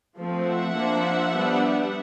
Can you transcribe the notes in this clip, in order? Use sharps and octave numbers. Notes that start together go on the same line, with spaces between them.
F3 A3 C4
E5 F#5
F3 A#3 D4
G3 B3 D4